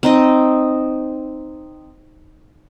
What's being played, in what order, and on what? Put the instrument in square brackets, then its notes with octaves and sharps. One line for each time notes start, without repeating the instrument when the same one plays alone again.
[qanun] C4 D#4 D#5